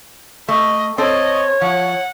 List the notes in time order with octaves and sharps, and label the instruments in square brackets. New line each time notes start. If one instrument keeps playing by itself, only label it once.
[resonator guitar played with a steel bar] A3 [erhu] D#5
[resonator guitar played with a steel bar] C4 A4 C5 [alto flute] C#5 [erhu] D#5
[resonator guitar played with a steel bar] F3 [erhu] F#5